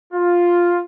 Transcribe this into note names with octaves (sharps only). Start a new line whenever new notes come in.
F4